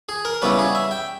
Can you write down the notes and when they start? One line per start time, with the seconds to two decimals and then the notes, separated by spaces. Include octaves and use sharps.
0.09 G#4
0.25 A#4
0.42 C#3 G3 B3 E4 B4
0.59 G#4
0.75 E5
0.91 G5